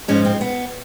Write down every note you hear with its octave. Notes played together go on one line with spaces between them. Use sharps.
G#2 F3 G#3 C#4
C4
B3